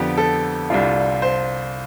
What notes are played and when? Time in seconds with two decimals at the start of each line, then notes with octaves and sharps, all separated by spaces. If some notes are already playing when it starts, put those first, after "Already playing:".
Already playing: F2 D3 F3 B3 G4
0.18 A4
0.70 C2 C3 G3 D4 F4
1.22 C5